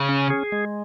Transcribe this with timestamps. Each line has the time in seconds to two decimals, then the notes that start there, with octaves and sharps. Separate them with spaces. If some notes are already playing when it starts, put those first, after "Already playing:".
Already playing: C#3
0.09 C#4
0.30 G#4
0.52 G#3